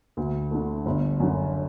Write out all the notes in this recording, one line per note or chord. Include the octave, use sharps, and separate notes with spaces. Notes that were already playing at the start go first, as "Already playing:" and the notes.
D2
D3 A3
G1
F#2 D3